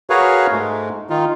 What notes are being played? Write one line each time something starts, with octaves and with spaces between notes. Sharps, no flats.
F#4 G#4 A#4 B4 C#5 F5
G#2 G#3 A3
D#3 D#4 F4